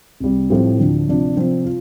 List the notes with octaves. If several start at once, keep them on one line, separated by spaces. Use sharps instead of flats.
C2 C3 G3
A2 F3 C4 G4
D2 D3 F3 D4
C3 F3 D4
C3 F3 C4
F4